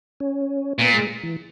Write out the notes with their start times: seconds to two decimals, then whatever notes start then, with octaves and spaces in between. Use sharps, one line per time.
0.20 C#4
0.79 A#2 B3
0.94 G#3
1.23 E3